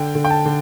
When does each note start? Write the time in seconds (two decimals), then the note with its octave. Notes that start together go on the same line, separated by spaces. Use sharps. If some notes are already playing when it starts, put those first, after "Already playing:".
Already playing: D3 G5
0.15 D3
0.25 G5
0.30 A5
0.46 D3